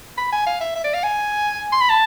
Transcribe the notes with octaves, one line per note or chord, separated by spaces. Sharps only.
B5
G#5
F5
E5
E5
D5
F5
G#5
C6
B5
A5